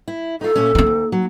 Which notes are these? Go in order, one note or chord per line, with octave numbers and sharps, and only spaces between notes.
E4
D#4 F4 A4
A#2 A3 C#4
D2 A#3 D#4
D2
F#3